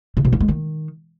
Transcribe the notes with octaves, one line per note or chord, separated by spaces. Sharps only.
C3
B2
G3
G#3
D#3